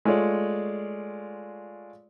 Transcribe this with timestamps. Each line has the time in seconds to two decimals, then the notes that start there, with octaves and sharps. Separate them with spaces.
0.05 G#3 A3 F4 C#5 D5